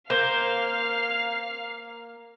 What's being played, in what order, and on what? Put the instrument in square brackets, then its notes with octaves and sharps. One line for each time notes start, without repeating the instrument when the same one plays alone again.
[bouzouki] A#3 [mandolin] C5 [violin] F5 F6